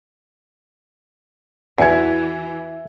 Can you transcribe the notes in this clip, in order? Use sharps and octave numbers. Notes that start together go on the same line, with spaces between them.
E2 E3 F#4 E5 G#5 G#6 C#7